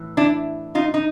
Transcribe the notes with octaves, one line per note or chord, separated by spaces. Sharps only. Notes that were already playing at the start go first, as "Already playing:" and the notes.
Already playing: A2 E3
D4 E4
D#4 F4
D#4